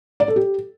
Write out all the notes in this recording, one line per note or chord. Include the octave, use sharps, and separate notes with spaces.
D5
A4
G4